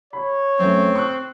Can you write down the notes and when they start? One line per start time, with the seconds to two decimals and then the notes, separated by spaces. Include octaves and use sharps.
0.13 C#5 B5
0.59 F#2 A3 C4
0.95 C#6 F#6